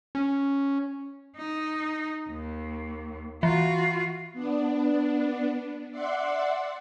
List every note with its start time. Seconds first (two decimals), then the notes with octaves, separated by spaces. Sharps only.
0.15 C#4
1.36 D#4
2.30 D#2
3.43 E3 F4 F#4
4.33 B3 D4
5.91 D5 E5 F#5 C6